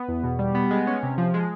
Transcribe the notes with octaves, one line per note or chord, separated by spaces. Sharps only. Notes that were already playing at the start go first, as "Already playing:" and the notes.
Already playing: B3
E2
B2
G3
B3
G#3
C#4
C3
F3
G#3